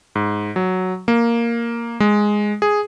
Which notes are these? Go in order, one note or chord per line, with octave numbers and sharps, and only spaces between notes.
G#2
F#3
A#3
G#3
G#4